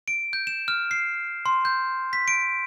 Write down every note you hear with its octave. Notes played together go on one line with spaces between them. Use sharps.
D7
G6
E7
F6
C7
C6
G6
B6
D7